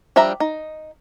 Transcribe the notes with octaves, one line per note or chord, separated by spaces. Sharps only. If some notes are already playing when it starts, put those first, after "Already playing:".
F3 G3 D4 E5 A#5
D#4